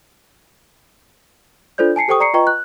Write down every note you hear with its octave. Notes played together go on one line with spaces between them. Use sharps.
D4 F4 A4 C5 D5 G6
G#5 A5 C7 C#7
G4 A4 C5 G5 C#6 D#6
D5 A#5 C#6 C7 C#7
F4 B4 D#5 G5 A#5 C#6
F#6